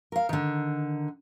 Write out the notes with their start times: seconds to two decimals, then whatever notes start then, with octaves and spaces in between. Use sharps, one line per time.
0.12 A#4 F5
0.29 D3 D#3